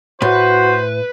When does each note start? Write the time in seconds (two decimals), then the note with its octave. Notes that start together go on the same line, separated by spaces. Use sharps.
0.22 A2 F#4 B4 C5